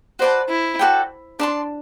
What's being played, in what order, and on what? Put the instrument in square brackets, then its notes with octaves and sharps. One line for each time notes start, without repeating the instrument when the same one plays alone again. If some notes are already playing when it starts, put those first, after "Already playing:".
[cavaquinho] F#4 B4 D5 A5 [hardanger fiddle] C5
[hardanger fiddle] E4
[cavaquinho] F#4 A4 D5 G5
[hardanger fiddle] D4 [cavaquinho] D5 A5 C6